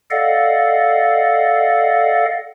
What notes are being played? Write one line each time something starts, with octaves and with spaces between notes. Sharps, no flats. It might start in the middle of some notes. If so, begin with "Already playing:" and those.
A4 D5 D#5 F5 F#5